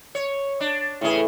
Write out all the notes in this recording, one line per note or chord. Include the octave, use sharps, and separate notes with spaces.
C#5
D4
A2 C#3 E3 G#4